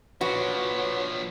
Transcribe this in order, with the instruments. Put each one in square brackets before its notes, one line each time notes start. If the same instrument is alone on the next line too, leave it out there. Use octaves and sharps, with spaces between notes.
[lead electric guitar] F3 D4 [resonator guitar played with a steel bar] F#4 [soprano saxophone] B4 [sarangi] C#5